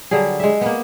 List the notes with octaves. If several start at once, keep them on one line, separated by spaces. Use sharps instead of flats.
D3 F#3 G3 G#4
G#3 E5
A#3 B3